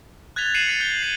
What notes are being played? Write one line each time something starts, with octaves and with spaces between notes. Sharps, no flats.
F#6 G#6 A6 B6 F7 G7
C7 C#7 D#7 E7 F#7
F#6 A6 B6 C#7
G6 G7
C7 D#7